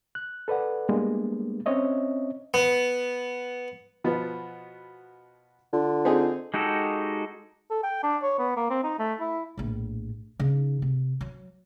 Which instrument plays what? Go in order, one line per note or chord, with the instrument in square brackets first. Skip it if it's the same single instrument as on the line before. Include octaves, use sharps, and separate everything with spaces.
[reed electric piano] F#6
A4 B4 D5 F#5
G3 G#3 A#3 B3 D4
C4 C#4 C#5 D#5 E5
[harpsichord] B3
[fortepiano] B2 F3 B3
[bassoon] D3 [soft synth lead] F4
[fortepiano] C4 D#4 G#4
[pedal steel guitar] G#3 D#4 F#4 G4 A4
[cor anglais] A4
G5
D4
C#5
B3
A#3
C4
D#4
A3
E4
[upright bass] A#1 A2
C#3 D#4
C3
F#3